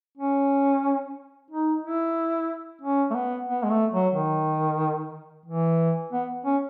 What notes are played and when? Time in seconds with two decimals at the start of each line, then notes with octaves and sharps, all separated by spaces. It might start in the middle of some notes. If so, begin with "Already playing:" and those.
0.18 C#4
1.51 D#4
1.83 E4
2.82 C#4
3.11 A3
3.15 B3
3.49 B3
3.63 G#3
3.70 A3
3.93 F#3
4.14 D#3
5.46 E3
6.13 B3
6.45 C#4